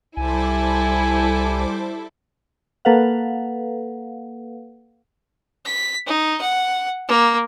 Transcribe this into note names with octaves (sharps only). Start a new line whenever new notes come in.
C2 G3 E4 A4 C5 G#5 D6
A#3 A4 B4 F5 F#5
B6
D#4
F#5
A#3